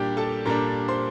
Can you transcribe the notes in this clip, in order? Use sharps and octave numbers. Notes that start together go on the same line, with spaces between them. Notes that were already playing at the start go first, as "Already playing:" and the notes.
Already playing: A#2 G3 D4 G4 G5
A4 A5
A#2 G3 D4 A#4 A#5
C5 C6